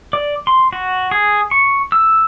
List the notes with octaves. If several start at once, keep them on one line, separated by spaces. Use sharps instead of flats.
D5
C6
F#4
G#4
C#6
E6